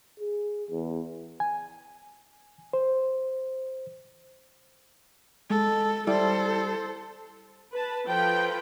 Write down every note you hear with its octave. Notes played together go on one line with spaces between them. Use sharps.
G#4
E2
G#5
C5
G#3 A4
G3 E4 A4 C5
B4 A5
F3 A4 B4 G5